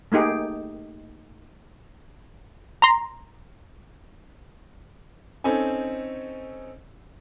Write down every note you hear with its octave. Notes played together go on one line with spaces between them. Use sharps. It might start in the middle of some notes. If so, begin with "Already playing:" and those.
A3 A#3 D#4 G4 G#4
A#5 C6
C4 C#4 D#4 A4 G#5